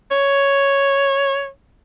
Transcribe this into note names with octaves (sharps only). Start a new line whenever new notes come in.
C#5